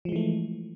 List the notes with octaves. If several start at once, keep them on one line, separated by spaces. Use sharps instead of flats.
E3 F3 G#3 A3